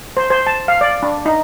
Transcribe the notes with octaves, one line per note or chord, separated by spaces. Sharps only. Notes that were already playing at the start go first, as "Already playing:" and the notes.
C5
C5
A5
F5
D5
D4
D#4